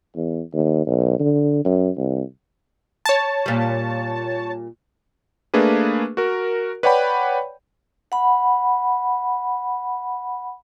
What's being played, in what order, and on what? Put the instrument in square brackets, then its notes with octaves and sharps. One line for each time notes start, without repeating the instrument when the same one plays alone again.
[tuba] E2
D#2
B1
D3
F#2
C2
[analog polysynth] C#5 A5
[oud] A#2 G3
[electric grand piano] A3 A#3 D4 G#4 B4
F#4 A#4
B4 C#5 D5 F#5 G5 B5
[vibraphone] F#5 B5